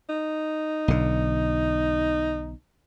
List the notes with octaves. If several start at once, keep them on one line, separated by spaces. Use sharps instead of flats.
D#4
B1 D3